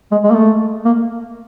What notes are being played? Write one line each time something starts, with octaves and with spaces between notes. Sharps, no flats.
G#3
G#3
A#3
A3
A#3